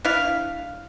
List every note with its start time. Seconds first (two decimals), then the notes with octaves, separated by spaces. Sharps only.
0.05 D4 E4 F5